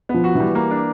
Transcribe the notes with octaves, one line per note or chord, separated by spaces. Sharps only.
B3
F3
F#4
E3 G3
A#3
D4